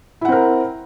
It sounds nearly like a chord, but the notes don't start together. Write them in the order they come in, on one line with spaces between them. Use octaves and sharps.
E4 F#5 C4 A#4